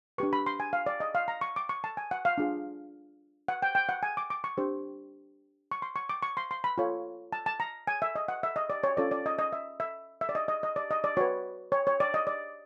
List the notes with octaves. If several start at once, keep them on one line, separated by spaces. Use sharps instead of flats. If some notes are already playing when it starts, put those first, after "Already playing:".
D4 G4 B4 C#6
B5
C6
G#5
F5
D5
D#5
F5
A#5
C#6
D6
C#6
A5
G#5
F#5
F5
D4 F4 G#4
F#5
G5
G5
F#5
G#5
D6
D6
C#6
D4 G4 C5
C#6
C6
C#6
D6
C#6
C6
C6
B5
F4 A4 C#5
A5
A5
A#5
G#5
E5
D#5
F#5
E5
D#5
D5
C#5
C#4 F4 A4 C#5 D5
D5
D#5
D#5
E5
E5
E5
D5
D#5
D#5
D#5
D5
D#5
D5
F#4 B4 C#5
C#5
C#5
D5
D#5
D5